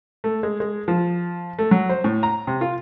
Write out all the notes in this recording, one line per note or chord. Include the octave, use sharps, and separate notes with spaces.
A3
G#3
G#3
F3
A3
F#3
C5
A2
A#5
C3
F4